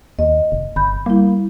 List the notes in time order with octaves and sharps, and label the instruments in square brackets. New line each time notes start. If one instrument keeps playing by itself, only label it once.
[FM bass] D#2 [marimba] D#5
[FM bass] F1
[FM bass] G1 [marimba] B5 G6
[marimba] G3 E4 [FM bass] A#3